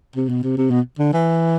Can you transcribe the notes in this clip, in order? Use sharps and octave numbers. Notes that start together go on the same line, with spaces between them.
C3
B2
C3
C3
B2
D3
E3